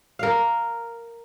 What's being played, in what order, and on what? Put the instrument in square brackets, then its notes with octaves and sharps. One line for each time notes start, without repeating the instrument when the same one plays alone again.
[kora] A#4 F5